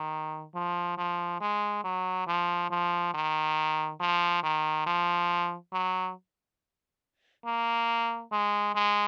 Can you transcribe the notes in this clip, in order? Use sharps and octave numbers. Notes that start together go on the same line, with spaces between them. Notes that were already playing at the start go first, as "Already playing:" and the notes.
Already playing: D#3
F3
F3
G#3
F#3
F3
F3
D#3
F3
D#3
F3
F#3
A#3
G#3
G#3